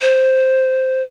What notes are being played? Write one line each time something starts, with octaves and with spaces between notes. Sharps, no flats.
C5